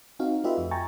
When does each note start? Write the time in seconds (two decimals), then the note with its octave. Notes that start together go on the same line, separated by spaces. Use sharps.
0.19 C4 D#4 F#4 F5
0.44 A3 F4 G4 B4 D#5 E5
0.58 F2
0.71 G5 G#5 A#5 C#6 A6